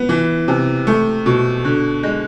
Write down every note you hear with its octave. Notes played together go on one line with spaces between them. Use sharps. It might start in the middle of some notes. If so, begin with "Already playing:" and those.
Already playing: B3
E3
C3
A3
B2
D3
G#3